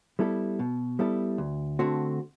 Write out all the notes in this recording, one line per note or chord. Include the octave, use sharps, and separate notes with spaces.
G3 B3 E4 A4
B2
G3 B3 E4 A4
D2
D3 A3 C4 F#4